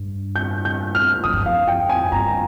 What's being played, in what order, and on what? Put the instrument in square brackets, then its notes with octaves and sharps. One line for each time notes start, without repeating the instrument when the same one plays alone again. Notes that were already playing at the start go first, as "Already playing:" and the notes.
Already playing: [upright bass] G2
[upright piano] G6
G6
F6
[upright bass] F2 [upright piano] D#6
[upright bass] G2
[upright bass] F2 [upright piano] F5
[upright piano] G5
G#5
[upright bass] G2 [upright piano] A#5